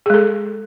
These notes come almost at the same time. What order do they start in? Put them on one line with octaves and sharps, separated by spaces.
G#4 G#3 A4